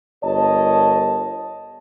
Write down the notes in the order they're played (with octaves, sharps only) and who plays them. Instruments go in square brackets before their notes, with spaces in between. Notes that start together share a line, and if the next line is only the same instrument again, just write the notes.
[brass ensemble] G1 A#4 C#5 D#5 A5